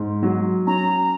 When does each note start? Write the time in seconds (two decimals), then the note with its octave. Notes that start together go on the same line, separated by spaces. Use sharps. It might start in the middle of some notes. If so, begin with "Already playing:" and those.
Already playing: G#2
0.23 F#3
0.67 C#4 A#5